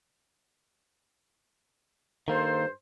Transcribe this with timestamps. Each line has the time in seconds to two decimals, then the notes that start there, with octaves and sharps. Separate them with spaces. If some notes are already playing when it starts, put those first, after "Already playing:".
2.28 G2 D#3 A#3 A4 C5